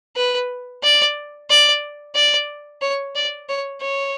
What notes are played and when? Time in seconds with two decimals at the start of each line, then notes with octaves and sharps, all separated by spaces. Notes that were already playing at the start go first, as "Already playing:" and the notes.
0.16 B4
0.83 D5
1.50 D5
2.15 D5
2.82 C#5
3.16 D5
3.49 C#5
3.81 C#5